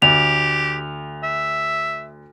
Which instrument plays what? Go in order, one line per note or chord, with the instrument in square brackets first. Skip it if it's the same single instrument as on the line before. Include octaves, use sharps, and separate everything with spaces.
[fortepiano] D2 [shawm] G4 [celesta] F7
[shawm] E5